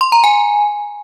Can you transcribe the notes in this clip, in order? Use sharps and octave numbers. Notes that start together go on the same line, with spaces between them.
C6
A#5
G#5